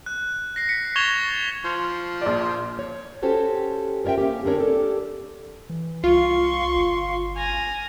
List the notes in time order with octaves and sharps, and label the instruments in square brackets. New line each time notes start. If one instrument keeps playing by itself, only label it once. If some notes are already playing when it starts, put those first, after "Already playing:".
[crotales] F#6
A#6 C7
B6 C#7
C#6 G#6 A6 E7 F7 G7
[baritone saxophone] F3 [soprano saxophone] C6
[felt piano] A#1 D5
[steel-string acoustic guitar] C#5
C#4 F#4 G4 A4 C5 C#5
F4 A#4 C#5 E5 G5
A#3 C#4 G4
D2 C4 D4 A#4 C#5
G4 A4 D5
[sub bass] E3
[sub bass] C2 [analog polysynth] F4 [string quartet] C6 C#6
[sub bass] G1
[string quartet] G#5 F6 A#6